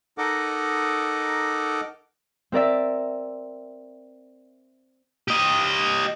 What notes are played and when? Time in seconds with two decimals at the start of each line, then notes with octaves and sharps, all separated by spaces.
0.18 D#4 A4 A#4 D#5 F#5 D6
2.52 C4 A#4 D5 E5
5.28 G4 D#5